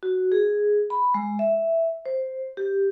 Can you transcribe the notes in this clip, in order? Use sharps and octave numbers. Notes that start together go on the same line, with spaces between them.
F#4
G#4
B5
G#3
E5
C5
G4